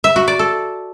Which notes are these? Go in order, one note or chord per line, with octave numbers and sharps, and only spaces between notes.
E5
F#4
D5
A4